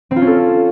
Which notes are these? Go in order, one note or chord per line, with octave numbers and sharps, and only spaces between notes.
C4
F4
C#4
A4